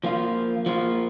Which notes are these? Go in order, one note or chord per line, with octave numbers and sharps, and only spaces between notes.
F3 A#3 F4
F3 A#3 F4